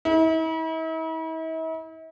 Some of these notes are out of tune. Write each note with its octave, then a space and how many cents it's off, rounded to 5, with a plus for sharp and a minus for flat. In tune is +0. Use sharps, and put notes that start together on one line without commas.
E4 -40